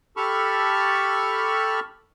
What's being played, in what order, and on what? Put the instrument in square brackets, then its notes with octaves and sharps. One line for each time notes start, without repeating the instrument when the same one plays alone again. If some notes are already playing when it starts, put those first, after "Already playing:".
[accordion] G4 A4 A5 B5 C#6 F6